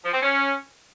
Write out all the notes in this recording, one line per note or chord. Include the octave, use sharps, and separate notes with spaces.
F3
C4
C#4